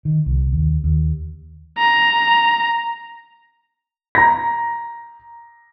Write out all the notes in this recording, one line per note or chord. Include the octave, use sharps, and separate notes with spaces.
D#3
C2
D#2
D#2
A#5
A#5 A#6